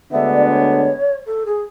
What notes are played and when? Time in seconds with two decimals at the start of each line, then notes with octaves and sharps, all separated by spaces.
0.12 D2 D3 G#3 B3 D4 E5
0.31 D5
0.50 C#5
1.26 A4
1.46 G#4